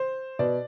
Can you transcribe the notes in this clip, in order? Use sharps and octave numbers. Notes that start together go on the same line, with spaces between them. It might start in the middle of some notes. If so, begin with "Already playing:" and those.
Already playing: C5
B2 D5